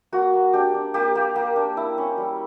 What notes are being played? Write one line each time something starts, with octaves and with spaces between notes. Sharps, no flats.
A#3 F#4
A#3
D4 G4
D4
A#3 G4
A#3
A#3
D4
E4
C#4
G3